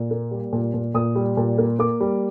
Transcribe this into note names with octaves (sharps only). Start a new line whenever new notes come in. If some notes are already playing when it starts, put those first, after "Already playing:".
Already playing: A#2
A#3
G3
A#2
A#2
A#2 D#6
G3
A#2
A#3
A#3 D6
G3